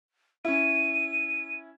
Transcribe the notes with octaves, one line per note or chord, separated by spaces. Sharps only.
C#4 E4 D#7